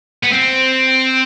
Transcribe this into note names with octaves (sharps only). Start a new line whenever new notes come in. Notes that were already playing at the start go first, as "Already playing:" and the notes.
B3
C4